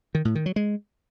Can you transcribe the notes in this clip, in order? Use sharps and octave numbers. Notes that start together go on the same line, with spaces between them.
D#3
A2
D#3
F#3
G#3